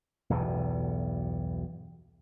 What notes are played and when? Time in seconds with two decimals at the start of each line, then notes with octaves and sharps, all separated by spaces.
0.30 B1 E2 G2 B2